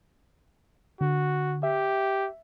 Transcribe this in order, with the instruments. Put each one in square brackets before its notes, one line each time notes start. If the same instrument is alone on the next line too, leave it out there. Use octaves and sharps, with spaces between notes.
[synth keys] D3 [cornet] F#4
[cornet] G4 [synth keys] E5